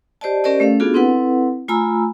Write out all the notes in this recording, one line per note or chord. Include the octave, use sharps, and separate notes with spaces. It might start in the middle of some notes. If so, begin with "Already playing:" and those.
G4 C5 D5 D#5 A5
C#4 G4 A#4 C5 D5 D#5
A3 C#4 A4 F5
B3 D4 F4 F#4 G#4 A4
C4 E4 A4 B4 F#5
A3 F4 G#5 A#5 B5 E6